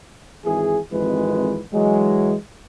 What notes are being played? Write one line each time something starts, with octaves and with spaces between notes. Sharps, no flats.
G#1 E3 G#4
G#1 F2 E3 G#3 B4
E3 F#3 G#3